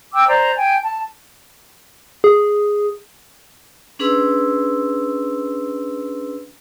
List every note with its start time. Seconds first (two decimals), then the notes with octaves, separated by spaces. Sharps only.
0.14 G5 D6 E6
0.28 C5 D5 A#5
0.57 G5 G#5
0.84 A5
2.24 G#4
3.99 C#4 D4 G#4 B4 C6 E6